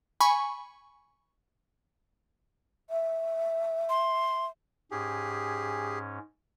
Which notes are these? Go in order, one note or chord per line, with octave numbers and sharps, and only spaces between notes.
G#5 B5 C#6
E5
C6
G#2 C#4 G4 G#4